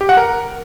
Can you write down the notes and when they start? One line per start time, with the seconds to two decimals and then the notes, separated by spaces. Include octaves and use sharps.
0.01 G4
0.09 F#5
0.17 A#4